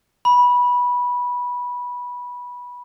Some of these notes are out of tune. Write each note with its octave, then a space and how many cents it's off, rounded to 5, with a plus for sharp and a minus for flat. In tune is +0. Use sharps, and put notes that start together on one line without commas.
B5 -15